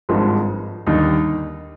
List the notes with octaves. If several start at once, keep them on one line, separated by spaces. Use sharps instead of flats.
G#1 G2 F3 G#3
D#2 D3 G3 D#4